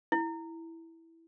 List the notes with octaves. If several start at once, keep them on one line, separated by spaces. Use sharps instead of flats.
E4